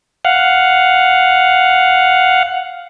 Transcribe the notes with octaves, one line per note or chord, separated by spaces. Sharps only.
F5 F#5